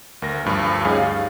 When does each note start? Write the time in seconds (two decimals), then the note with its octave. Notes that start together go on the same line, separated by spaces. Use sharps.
0.22 D2 A#4 A#6
0.45 D2 G2 F3
0.85 G3 C#4 D#4 G#4 F5
1.00 F5 A6